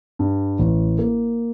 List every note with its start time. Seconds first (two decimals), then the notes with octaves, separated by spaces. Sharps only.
0.19 G2
0.59 A1
0.99 A#3